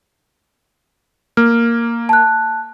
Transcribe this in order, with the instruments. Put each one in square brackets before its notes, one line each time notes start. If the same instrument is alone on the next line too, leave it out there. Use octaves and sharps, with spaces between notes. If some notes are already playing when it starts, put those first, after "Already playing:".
[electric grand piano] A#3 [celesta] F6
[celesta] A5 F#6